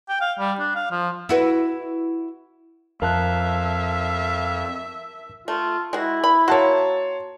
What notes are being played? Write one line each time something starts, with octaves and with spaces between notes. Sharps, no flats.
G5
F5
G3
D4
F5
F3
E4 F#4 B4
F2 A#4 E5 F5 A5 F#6
A3 F4
G#3 E4 F#4
B5
A#3 F#4 C#5 A5 C6